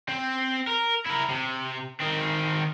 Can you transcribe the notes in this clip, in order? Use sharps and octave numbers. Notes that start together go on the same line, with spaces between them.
C4
A#4
E4 A#4
C3
D#3 C4